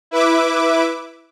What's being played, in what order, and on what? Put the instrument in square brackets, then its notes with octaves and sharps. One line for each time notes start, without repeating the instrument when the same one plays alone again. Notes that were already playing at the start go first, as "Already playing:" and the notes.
[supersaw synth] E4 B4 E5 D6